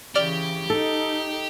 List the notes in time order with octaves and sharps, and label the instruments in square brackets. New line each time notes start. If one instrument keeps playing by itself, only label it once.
[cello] C#3 E3 [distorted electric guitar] G4 [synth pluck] D5 F6
[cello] D#4 [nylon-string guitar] A4